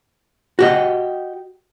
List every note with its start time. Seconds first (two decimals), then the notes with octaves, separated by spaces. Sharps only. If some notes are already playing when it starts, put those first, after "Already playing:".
0.59 F#4 G4 D#5